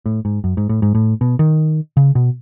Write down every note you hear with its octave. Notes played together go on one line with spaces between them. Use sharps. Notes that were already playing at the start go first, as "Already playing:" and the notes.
A2
G#2
F#2
G#2
A2
G#2
A2
B2
D#3
C#3
B2